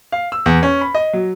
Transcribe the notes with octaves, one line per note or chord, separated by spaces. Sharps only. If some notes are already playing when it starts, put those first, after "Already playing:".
F5
E6
E2
C#4
B5
D#5
F#3